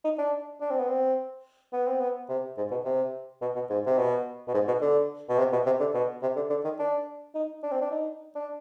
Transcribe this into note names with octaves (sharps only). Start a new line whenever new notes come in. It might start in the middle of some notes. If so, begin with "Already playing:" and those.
D#4
D4
D4
C4
B3
C4
B3
C4
B3
C3
G#2
B2
C3
B2
B2
G#2
C3
B2
B2
G#2
B2
D3
B2
C3
B2
C3
D3
B2
C3
D3
D3
D#3
D4
D#4
D4
C4
D4
D#4
D4